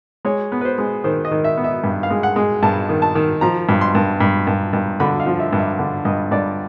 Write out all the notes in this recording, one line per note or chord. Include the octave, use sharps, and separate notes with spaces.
G#3 C#5
B3
B4
C5
G#3
D#3 C5
D#5
D#3
E5
B3
E5
G2
F5
G#3
F#5
G#3
G2 A5
D#3
A5
D#3
F3 A#5
G2
C6
G2
G2
G2
G2
D3 B5
F5
F3
E5
G2
E5
D3
G2 D#5
G2 D5